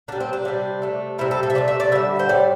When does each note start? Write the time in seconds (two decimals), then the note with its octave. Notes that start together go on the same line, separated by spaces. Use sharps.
0.08 D3 D4
0.12 G3
0.20 C4
0.33 D4
0.45 C3 G3
0.82 C3 A3
1.18 C3 G3 E4
1.31 A4
1.43 A4
1.50 E5
1.55 C3 A3 D5
1.68 E5
1.80 D5
1.92 D3 G3 E5
2.19 C5
2.29 A2 G3 D5